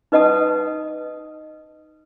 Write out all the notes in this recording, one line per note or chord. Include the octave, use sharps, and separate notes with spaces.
D#4 B4 D#5 F#5 A5 D#6